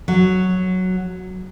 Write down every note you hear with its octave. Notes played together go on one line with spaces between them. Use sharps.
F#3